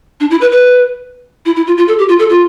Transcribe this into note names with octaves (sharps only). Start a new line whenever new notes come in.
D4
E4
B4
B4
E4
E4
F4
F4
A4
G4
F4
A4
F4